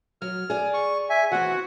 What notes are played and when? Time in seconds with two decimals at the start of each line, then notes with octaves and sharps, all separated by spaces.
0.22 F#3 F6
0.50 G#4 D5
0.74 C#6
1.10 E5 G#5
1.32 E3 C4 F#4 F#5